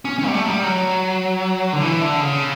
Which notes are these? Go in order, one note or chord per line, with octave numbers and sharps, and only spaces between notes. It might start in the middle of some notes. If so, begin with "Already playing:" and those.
C#4
C#4
G3
A3
F#3
G3
F#3
D3
E3
D3
C#3